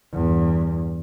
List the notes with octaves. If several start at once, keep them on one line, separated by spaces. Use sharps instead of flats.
E2 G2